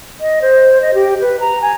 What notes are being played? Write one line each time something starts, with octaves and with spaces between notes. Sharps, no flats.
D#5
C5
D#5
G4
B4
A#5
G#5